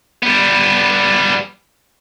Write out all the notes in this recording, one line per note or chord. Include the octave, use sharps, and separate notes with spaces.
G3 B3